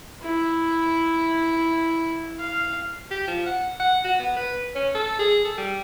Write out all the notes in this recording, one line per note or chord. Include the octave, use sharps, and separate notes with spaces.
E4
F5
G4
F3
F#5
F#5
F#4
B3
B4
C#4
A4
G#4
A4
G3